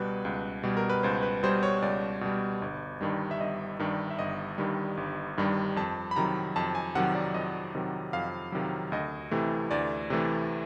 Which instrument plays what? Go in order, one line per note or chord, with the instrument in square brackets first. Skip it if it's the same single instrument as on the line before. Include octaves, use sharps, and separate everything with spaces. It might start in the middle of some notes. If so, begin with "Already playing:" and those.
Already playing: [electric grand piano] C#2 B2 G3 B4
C#2
B2 G3
A#4
B4
C#2 C5
B4
B2 G3 C5
C#5
C#2 D5
B2 G3
G1
G2 D#3 G3
E5
G1 D#5
G2 D#3 G3
E5
G1 D#5
G2 D#3 G3
G1
G2 D#3 G3
F2 A5
B5
C3 D#3 F#3 A#5
F2 A5
G#5
C3 D#3 F#3 F#5
D5
F2 D#5
C3 D#3 F#3
F2 F5
C3 D#3 F#3
D2 D#5
C3 E3 A3
D2 D5
C3 E3 A3